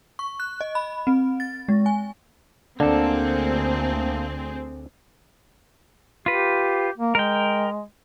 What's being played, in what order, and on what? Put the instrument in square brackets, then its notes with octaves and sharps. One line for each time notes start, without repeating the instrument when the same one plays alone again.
[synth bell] C#6
F#6
D#5
B5
C4
A6
G#3
G#5
[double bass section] D2 [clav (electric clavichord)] D3 D4 [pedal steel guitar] A#3 A4 [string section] C4 G#4
[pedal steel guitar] F4 B4 [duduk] G4
[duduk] A#3
[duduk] G#3 [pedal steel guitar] A#4 G5